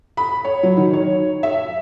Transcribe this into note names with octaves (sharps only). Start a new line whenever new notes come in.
B5
C#5
F#3
D#3
C#5
E5